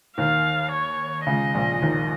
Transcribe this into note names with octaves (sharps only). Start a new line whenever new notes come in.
D#2 D#3 F5
C#5
C#2 C#3 D#5
A#1 A#2
D#2 D#3